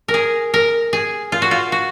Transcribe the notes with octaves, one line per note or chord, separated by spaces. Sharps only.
A#4
G#4
A#4
G#4
F4
F#4
F4
F#4